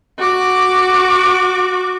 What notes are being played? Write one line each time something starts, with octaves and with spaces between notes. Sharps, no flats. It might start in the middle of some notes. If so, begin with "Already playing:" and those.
F#4 D6